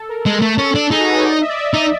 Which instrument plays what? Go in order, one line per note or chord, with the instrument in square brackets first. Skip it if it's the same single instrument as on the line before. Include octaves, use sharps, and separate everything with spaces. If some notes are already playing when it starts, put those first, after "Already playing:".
Already playing: [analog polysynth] A4
A#4
[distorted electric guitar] G#3 [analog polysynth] A4
[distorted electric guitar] A3
[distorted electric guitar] C#4 [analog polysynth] A4
[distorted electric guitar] D4
[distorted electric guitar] D#4 [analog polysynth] G#4
[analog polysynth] F#4
B4
C#5
D5
D#5
E5
D5
E5
[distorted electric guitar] D#4